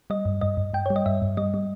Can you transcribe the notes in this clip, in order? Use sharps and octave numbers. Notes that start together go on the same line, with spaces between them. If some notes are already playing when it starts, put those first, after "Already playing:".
G3 D#5
G2
G2 D#5
G2
G2 G5
G3 C#5
D#5
G2 E5
G2
G3 D#5
G3